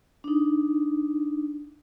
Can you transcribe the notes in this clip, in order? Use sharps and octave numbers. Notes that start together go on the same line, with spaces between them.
D4 D#4